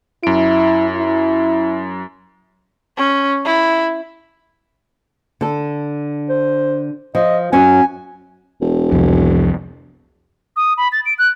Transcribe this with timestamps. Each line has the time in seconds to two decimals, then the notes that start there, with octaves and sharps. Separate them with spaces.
0.23 F#2 E4 D7
0.96 E4
2.97 C#4
3.45 E4
5.41 D3 A4
6.29 C5
7.15 F3 D#5
7.53 F#2 F#3 C#4 G#5
8.61 E1
8.92 C2 F2
10.56 D#6
10.77 B5
10.92 A6
11.06 D7
11.19 F#6